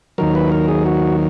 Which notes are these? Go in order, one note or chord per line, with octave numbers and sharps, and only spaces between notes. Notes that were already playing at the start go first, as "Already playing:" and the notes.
D#2 D#3 F#3 A#4
B4
A#4
G#4
F#4